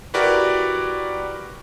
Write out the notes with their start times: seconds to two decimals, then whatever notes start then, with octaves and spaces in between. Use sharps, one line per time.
0.14 E4 F#4 G4 A#4 B4 D5